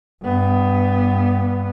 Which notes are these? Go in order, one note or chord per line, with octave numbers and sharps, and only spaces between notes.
G2 B3